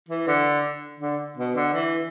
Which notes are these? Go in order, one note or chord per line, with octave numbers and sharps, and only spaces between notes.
E3
D3
D3
B2
D3
E3